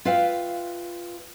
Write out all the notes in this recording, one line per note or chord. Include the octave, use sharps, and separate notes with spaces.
F4 B4 E5 F5 G5